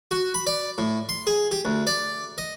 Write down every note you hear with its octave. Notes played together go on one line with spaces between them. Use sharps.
F#4
B5
D5
A2
C6
G#4
G4
D2
D5
D#5